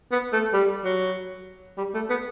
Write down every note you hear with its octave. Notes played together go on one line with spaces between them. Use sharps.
B3
A3
G3
F#3
G3
A3
B3